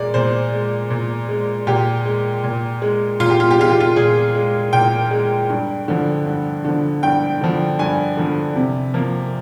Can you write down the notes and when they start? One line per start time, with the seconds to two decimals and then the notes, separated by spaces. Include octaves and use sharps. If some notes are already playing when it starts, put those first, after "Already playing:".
Already playing: A#2 G#3 D5
0.14 A#2 C5
0.52 G#3
0.90 A#2
1.29 G#3
1.67 A#2 G4
2.05 G#3
2.44 A#2
2.82 G#3
3.20 A#2 F4
3.30 G4
3.40 F4
3.51 G4
3.58 G#3 F4
3.70 G4
3.80 F4
3.96 A#2 G#4
4.34 G#3
4.73 A#2 G5
5.11 G#3
5.50 G2
5.88 D3 F3
6.26 G2
6.65 D3 F3
7.03 G2 G5
7.41 D3 F3
7.79 G2 G#5
8.17 D3 F3
8.56 C3
8.94 F3 A#3